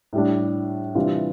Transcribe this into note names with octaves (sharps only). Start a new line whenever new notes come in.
A2 G3 D4
C3 E3 G3 D4 F4